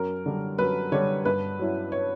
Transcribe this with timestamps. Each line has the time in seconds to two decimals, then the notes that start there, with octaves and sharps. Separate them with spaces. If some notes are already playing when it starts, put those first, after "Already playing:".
Already playing: F#2 A#4
0.26 D3 G3
0.58 F#2 B4
0.92 D3 G3 C#5
1.25 G2 B4
1.59 F#3 C#4 E4
1.92 C#5